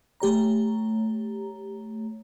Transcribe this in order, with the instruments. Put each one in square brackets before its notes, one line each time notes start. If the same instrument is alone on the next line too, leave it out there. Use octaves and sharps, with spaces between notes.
[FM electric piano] A3 G4 C#5 A#5